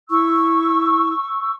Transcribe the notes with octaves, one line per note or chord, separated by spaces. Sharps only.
E4 C#6 E6